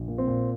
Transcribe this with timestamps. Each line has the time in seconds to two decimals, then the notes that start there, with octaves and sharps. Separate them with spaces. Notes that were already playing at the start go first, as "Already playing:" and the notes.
Already playing: A#1
0.08 A#2
0.18 C4
0.28 A#2